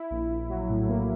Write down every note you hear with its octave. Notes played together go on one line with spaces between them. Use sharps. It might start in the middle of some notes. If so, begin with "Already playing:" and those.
Already playing: E4
A#1
A#1
F#3
A2
A#3